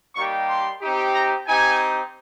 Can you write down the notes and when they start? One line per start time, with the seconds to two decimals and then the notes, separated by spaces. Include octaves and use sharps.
0.15 G3 A#3 D#4 G4 C#6
0.48 C6
0.82 C4 D#4 G4
1.14 A#5
1.47 C4 D#4 G4 G#5